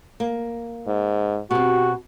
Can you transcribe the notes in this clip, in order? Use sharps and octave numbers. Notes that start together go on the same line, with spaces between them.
A#3
G#2
B2 C4 F#4 G4